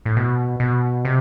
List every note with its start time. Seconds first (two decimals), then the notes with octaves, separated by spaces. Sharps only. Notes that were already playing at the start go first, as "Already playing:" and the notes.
0.05 A2
0.17 B2
0.60 B2
1.05 C3